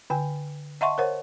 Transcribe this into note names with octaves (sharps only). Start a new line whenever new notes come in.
D3 G5 G#5
D#5 E5 F#5 A5 C6 C#6
A#4 C5 C#5 F#5